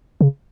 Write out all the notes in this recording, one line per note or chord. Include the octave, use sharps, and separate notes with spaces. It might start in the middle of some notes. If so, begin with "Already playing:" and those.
C#3